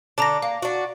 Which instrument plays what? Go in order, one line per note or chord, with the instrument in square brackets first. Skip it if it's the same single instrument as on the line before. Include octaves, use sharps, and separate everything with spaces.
[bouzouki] D3 D4 [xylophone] A5 A#5 A#6
[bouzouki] A#3 [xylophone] F5
[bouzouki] D4 F#4